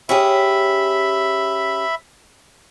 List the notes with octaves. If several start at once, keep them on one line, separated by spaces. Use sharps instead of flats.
C#4 G4 G#4 E5 B5